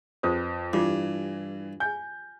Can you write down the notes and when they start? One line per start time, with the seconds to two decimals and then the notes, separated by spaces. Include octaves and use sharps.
0.23 F2 F4 B4 C5 D#6
0.73 G2 E3 F4 G4 D6
1.80 G#5 G6